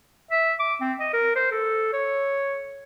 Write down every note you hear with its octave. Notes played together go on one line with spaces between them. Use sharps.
E5
D6
C4
D#5
A#4
C5
A4
C#5